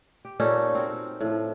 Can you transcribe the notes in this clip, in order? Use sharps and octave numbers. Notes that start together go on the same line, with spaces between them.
G4
A#2 C#4 D#4 A4
C4 F#4
A2 F3